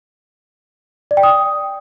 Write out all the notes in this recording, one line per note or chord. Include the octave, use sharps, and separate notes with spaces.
D5
G5
D#6